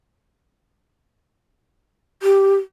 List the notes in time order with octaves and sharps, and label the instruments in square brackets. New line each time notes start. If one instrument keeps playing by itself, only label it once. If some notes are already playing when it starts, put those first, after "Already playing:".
[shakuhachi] G4